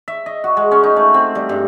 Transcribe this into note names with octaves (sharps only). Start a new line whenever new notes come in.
E5
D#5
F#4
G#3
C#4
D#4
A3
C4
G3
G2